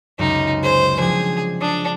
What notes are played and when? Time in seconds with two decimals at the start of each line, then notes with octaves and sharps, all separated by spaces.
0.19 C#2 F#2 C3 D#4
0.63 G#4 C5 G#5
1.00 F3 C4 D4 G#4
1.61 D4 D#6